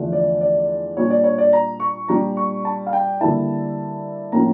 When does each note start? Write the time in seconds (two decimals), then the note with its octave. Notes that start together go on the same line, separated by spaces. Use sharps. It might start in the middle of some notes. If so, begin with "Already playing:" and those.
Already playing: E2 D3 F3 A3 D4
0.13 D5
0.41 D5
0.96 A#2 G3 D4 C#5
1.10 D5
1.24 C#5
1.38 D5
1.53 A#5
1.80 C#6
2.08 A#2 G3 D4 A#5
2.37 C#6
2.65 A5
2.86 F5
2.93 G5
3.21 D3 G3 A#3 E4 A5
4.32 A2 F3 A#3 C#4 A#5